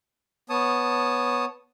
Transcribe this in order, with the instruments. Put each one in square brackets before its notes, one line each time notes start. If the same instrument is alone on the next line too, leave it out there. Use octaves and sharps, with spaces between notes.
[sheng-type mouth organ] B3 C#5 A5 D#6